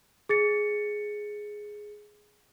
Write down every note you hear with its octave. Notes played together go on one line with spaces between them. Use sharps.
G#4 A6 C#7